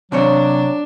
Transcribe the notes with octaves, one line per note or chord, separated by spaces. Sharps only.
C3 F#3 C4 D4 C#5